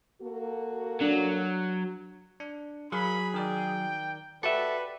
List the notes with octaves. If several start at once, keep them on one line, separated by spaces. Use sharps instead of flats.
A#3 F#4 A4
F#3 D4
D4
F#3 G#4 A#4 F5 B5 C#6
D#3 A#4 D5 G5
F#4 G4 A4 B4 D5 E5